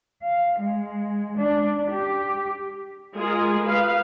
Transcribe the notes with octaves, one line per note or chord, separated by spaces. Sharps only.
F5
G#3
D4
G4
G#3 F4 G#4 A#4
B4 F5